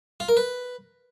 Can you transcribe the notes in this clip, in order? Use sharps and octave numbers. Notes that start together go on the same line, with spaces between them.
F4
A#4
B4